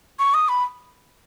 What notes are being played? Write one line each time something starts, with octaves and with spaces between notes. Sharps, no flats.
C#6
D#6
B5